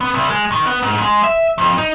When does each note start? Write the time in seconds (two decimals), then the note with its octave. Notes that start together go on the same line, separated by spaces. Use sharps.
0.01 B3
0.14 C2
0.30 G#3
0.52 D#3
0.66 B3
0.83 G#2
1.02 G#3
1.24 E5
1.58 F2
1.78 D#4